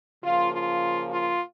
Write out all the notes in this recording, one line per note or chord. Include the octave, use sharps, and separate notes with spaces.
C#3 F3 A#3 F4
F4
F4